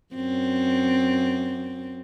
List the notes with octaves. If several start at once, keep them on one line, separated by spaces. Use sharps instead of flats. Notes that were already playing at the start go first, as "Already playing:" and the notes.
F#2 C4